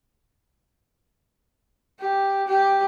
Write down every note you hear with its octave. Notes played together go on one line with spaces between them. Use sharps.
G4
G4